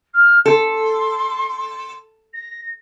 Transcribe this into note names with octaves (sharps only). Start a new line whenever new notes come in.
F6
A4 C6
A#6